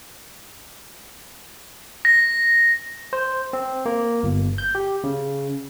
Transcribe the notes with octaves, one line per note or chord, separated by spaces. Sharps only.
A#6
C5
C4
A#3
G1
G6
G4
C#3